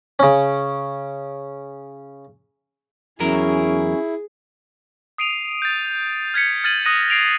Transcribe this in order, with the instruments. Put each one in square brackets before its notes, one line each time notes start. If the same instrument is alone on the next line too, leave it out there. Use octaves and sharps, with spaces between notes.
[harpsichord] C#3 C#4
[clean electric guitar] E2 F#3 A#4 [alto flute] C#4 [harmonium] E4 [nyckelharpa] G#4
[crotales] D#6 C7 D7 D#7 F7
G6 A6
F6 G#6 B6 C#7
F6 G#6 A6 C#7 D#7 F#7
D#6 F#6 A#6 D#7
C7 D7 F7